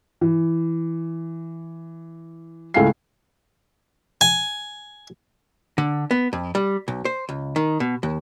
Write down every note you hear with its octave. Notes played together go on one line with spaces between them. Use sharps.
E3
C#2 A3 E4 F5 G#5 C7
G#5
D3
B3
F2
G3
B1
C5
C#2
D#3
B2
D#2